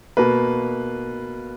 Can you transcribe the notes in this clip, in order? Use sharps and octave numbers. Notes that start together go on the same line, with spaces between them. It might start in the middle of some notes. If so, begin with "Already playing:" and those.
B2 A#3 B4